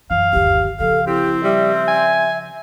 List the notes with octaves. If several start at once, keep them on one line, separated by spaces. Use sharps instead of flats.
F#2 E3 F5
G1 D#2 G4
C#3 F3 A4 F5
C4 E4 G4
G3 E5
G#5